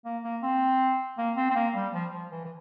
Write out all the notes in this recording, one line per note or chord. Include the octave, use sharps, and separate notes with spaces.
A#3
A#3
C4
A#3
C4
C4
A#3
G3
F3
F3
E3
E3